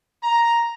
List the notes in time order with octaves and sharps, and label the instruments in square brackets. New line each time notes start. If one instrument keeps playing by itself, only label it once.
[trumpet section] A#5